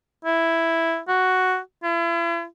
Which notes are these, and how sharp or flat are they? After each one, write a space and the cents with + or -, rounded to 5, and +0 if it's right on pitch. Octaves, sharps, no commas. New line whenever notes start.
E4 +0
F#4 +5
E4 +40